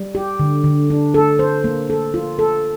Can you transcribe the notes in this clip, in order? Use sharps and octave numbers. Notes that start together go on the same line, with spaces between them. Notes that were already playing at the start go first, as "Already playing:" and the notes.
Already playing: G3
G4
D3
D3
D4
A4
C5
A#3
A4
F4
A4